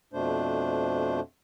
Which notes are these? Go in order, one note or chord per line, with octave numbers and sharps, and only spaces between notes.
F2 B2 A3 D4 C5